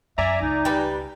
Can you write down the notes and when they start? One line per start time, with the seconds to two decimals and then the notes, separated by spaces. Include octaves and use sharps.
0.18 F#2 D5 E5 G#5 A#5
0.42 C#2 D#4
0.65 G3 B4